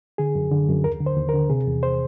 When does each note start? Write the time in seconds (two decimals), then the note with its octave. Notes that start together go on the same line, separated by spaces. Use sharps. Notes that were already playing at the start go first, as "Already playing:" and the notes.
0.18 D3 G#4
0.35 F#2
0.51 D3
0.69 F#2
0.84 D#2 A#4
1.00 D3
1.06 C5
1.17 D#2
1.29 A#4
1.34 D3
1.50 C3 G#4
1.67 E2
1.83 C5